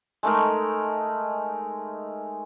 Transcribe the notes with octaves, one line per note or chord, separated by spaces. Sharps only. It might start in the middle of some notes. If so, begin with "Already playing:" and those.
G#3 A3 D#4 A#4